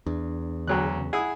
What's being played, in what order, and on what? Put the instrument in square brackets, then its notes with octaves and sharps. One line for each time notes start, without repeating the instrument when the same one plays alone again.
[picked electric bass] E2 [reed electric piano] D4
[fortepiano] D2 F#3 F#6 [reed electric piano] D3 G#4
[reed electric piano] C#3
[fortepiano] E4 G#4 [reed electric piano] F#5 E6 G#6